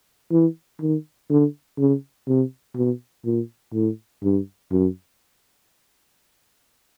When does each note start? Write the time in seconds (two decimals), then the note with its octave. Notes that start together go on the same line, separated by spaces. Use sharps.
0.32 E3
0.81 D#3
1.30 D3
1.79 C#3
2.27 C3
2.76 B2
3.25 A#2
3.74 A2
4.23 G2
4.72 F#2